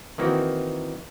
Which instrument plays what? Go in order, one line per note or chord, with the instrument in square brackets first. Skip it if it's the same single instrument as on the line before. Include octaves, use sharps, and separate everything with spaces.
[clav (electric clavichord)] D#3 E3 A#3 C4 F#4